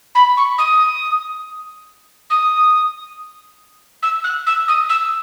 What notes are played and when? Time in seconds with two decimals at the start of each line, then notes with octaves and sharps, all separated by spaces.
0.15 B5
0.37 C#6
0.58 D#6
2.30 D#6
4.02 E6
4.24 F#6
4.46 E6
4.68 D#6
4.89 E6